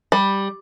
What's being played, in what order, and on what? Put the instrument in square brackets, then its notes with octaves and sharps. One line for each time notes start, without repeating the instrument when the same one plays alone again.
[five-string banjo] G3